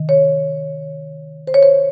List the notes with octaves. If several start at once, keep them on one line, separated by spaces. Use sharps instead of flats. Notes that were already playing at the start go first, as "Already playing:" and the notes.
Already playing: C3 D#3
C#5
C5
C#5
C5